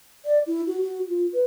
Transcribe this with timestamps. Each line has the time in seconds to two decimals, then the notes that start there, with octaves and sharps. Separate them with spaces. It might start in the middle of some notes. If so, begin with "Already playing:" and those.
0.25 D5
0.47 E4
0.67 F#4
0.81 F#4
1.09 F4
1.33 B4